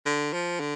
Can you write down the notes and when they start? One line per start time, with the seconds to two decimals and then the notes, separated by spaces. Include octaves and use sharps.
0.06 D3
0.33 F3
0.60 D3